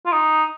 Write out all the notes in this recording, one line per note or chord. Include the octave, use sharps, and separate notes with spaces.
F4
D#4